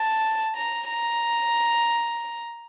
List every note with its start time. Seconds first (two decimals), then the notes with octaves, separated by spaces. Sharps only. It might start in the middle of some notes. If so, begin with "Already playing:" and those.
Already playing: A5
0.57 A#5
0.90 A#5